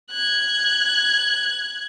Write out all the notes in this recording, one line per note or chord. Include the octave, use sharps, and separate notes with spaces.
F#6 G#6